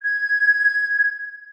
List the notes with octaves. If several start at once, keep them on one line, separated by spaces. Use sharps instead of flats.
G#6